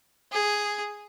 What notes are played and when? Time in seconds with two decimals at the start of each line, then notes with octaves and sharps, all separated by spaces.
0.32 G#4